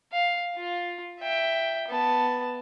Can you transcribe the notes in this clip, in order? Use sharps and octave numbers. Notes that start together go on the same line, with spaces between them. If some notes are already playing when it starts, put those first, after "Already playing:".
F5
F4
E5 G5
B3 A5